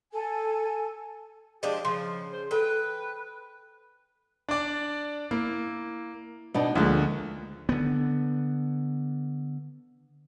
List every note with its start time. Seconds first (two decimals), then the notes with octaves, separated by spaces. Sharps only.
0.13 A4 G#5
1.63 F3 G#3 D4 G4
1.85 C#3 F3 C6
2.33 C5
2.51 A4 B4 G5
4.49 D4 D5
5.31 A#3 E4
6.54 B2 B3 D4 D#4
6.75 D2 D3 F3 G#3 A#3
7.69 D3 B3